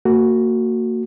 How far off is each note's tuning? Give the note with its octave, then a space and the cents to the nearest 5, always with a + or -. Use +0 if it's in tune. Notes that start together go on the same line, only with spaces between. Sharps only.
A#3 -30 F#4 +0